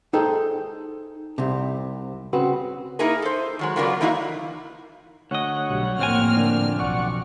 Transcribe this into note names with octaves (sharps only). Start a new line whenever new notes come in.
D#4 G#4 A4 C5 G5
C2 C3
C#3 C4 F#4 B4
A#3 D#4 E4 G#4 A#4
A4 C5
D#3 F#3 G#3
C#3 F#3 B3 F4 A#4 D5
E3 A#3 D#4 E4 F#4 F5
D2 C#5 D#5 F#5
B1 G3
F2 A2 A#3 C4 G#5 F6
D3 D4
B1 D5 F#5 C#6